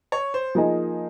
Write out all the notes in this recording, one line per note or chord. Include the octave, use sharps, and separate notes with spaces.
C#5
C5
F3 A#3 D#4 G#4 D#5